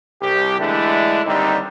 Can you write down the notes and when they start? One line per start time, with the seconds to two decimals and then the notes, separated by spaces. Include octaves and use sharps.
0.22 C2 G4
0.59 D3 E3 G#3 A3 D4 E4
1.26 D#2 D3 G3 C4 D#4